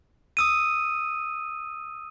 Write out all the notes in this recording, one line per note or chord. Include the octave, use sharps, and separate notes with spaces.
D#6 E6 D#7